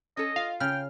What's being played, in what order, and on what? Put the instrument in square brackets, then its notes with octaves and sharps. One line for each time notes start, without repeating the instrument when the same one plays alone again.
[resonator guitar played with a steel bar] C#4 A4 [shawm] D#5
[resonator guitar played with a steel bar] F4 [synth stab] F5
[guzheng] C#3 [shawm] G5 [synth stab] F6